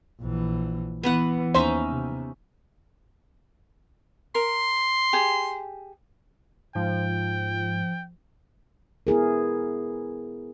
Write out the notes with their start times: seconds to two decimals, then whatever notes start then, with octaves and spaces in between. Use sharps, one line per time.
0.21 A#1 E3
1.03 E3 B3 B4 F#5
1.54 D#2 C#4 D#4 C5 E5
1.88 C3
4.35 A#4 C6
5.13 G4 G#4
6.75 G#2 F3 G5
9.07 B3 E4 G#4 A#4